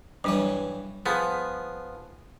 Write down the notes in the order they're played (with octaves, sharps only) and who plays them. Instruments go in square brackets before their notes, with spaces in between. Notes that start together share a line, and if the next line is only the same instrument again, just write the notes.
[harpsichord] G2 E3 C#5 [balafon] F#3 G3 D4
[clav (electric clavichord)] F3 B3 [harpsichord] G#4